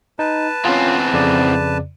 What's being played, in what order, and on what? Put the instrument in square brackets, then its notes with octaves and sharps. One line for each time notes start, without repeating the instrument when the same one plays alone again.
[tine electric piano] D#4 [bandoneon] B4 A5
[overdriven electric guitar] E2 C4 [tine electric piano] C#4 F4
[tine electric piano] F2 C#3 D5